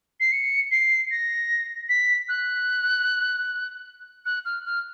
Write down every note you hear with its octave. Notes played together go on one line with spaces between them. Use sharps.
C7
C#7
C7
A#6
B6
F#6
F#6
F6
F6